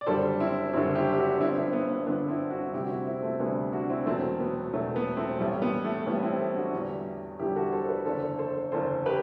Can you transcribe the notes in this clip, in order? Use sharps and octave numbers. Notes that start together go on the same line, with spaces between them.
D5
F#1 F#2 D3 G3 A4 C5
C4 E4
F#1 F#2 D3 G3 C4 E4
E4 G4
G4
D4 F#4
G1 G2 D3 C4 E4
C4 E4
B3
B3
G1 G2 D3 B3 D4
C4 E4
D4 F#4
D2 C3 G3 E4 G4
F#4
C4 E4
C4 E4
A3 C4
D2 C3 G3 B3 D4
D4 F#4
C4 E4
E1 E2 B2 F#3 A3 C4
B3
E1 E2 B2 F#3 A3
B3
A3 C4
A1 A2 G3 A3
B3
A3
A1 A2 G3 B3
C4 E4
A3
D4 F#4
E2 D3 G3
E2 D3 G3 E4 G4
F#4 A4
A4 C5
B4 D5
F#1 E2 D3 A4 C5
A4 C5
F#1 E2 D3 A4 C5
G4 B4